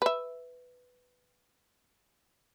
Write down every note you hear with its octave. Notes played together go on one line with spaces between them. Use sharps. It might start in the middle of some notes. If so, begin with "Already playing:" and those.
B4 E5